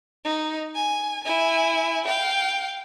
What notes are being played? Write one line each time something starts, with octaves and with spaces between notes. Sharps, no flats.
D#4
G#5
E4 G#5
F5 G5